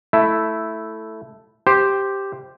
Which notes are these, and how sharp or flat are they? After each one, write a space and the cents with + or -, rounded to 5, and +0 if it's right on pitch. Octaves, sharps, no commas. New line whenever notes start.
A3 +0 E4 +0
G4 +0 C5 +0